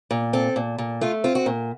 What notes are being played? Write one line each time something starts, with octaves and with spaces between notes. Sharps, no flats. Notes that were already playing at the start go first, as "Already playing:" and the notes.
A#2
C4 A4
A#2
A#2
A3 F4
C4 F4
F#4
A#2